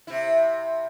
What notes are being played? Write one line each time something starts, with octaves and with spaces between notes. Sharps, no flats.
C3 E4